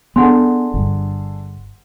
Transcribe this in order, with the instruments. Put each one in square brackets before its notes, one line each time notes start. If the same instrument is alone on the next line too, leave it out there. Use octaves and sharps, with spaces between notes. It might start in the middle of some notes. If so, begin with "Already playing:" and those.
[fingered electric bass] B3 [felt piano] D4 G#4 A4 [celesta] F#5 G#5 C6
[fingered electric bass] G1 G2